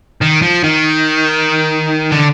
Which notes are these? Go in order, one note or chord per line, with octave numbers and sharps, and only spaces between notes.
D#3
F3
D#3
D3